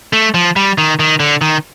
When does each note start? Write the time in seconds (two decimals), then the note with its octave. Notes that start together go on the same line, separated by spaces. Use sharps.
0.13 A3
0.34 F3
0.56 G3
0.78 D#3
1.00 D#3
1.20 D3
1.41 D#3